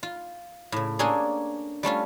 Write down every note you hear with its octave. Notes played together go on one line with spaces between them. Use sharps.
F4
A2 C#3
A#3 C#4 D4 G#4 A4 G#5
G3 A3 C#4 F4